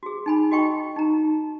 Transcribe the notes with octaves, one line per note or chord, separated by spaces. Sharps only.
F#4 G#4
D#4 G#5 B5
F#4 D#5 G5 C#6
D#4 A#5